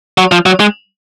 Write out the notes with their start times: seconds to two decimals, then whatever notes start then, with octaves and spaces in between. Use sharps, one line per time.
0.18 F#3
0.32 F3
0.46 F#3
0.60 G#3